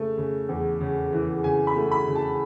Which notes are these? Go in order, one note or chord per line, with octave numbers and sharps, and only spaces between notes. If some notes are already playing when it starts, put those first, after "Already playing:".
Already playing: C#3 A3
C#3
E2
C#3
E3
C#3 G#5
B5
A3
B5
C#3
A5